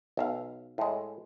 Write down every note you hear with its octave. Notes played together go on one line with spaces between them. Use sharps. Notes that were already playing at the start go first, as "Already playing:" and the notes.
B1 E5 F5
A2 G#3